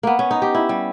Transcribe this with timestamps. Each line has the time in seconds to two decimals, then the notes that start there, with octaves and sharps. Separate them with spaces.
0.03 A#3 B3
0.19 C#4
0.31 D#4
0.42 G4
0.55 E4
0.69 G3